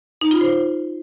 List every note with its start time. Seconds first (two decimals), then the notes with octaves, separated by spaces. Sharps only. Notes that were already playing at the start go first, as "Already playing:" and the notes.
0.21 D#4
0.31 F4
0.41 C5